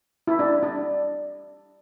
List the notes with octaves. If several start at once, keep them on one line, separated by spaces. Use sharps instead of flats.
E4
D4
D4